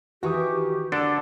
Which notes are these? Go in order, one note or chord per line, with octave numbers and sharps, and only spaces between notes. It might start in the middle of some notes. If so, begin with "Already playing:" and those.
D#3 E3 F#4 G4 C#6 D#6
D3 D4 A4 A#4